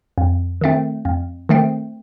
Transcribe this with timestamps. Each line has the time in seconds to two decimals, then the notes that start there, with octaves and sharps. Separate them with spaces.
0.18 F2
0.61 D#3 A3 C4
1.05 F2
1.49 D#3 A3 C4